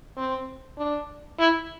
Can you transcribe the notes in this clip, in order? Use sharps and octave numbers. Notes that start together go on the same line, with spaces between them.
C4
D4
E4